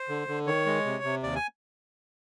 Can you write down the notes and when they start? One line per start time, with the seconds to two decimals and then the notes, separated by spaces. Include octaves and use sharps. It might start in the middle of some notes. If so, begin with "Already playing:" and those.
Already playing: C5
0.09 D3
0.28 D3
0.47 D#3 C#5
0.66 G#3
0.85 C3
1.04 C3
1.23 D#2 D5
1.36 G#5